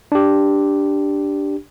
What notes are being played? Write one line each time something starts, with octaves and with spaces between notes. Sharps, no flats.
D4 G4